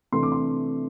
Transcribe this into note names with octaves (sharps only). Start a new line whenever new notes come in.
C3 E3 A3 D4 C6
D6
C6